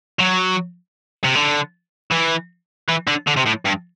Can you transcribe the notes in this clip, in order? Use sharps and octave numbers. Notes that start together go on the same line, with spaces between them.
F#3
C3
D3
E3
E3
D3
D3
C3
A2
G2